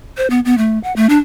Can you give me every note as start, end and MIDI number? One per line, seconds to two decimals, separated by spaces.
0.17 0.29 72
0.30 0.40 59
0.45 0.57 59
0.58 0.79 57
0.84 0.94 78
0.96 1.07 57
1.09 1.18 62